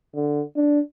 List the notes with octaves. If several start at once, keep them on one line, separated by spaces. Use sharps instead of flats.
D3
D4